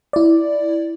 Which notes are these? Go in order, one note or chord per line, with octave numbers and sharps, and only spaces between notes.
E4 D5